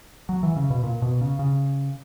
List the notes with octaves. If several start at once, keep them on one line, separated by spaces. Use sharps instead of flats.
F#3
E3
C#3
B2
A#2
B2
C#3
C#3